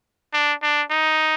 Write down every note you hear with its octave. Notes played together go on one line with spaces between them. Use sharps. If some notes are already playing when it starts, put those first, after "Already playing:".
D4
D4
D#4